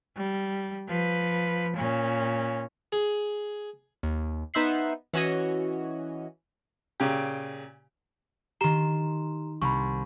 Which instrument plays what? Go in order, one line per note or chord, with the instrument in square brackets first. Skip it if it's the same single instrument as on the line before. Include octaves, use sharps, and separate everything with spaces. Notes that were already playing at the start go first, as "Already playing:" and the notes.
[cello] G3
F3 B4
A#2 C#4
[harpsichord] G#4
[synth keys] D#2
B3 D#4 C5 E5 F#6 C7
E3 C#4 F#4 C#5 D#5
[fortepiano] A#2 C#3 G4
[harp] D#3 C6 [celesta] G4 A#5 E7
[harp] C2 [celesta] B5 C#6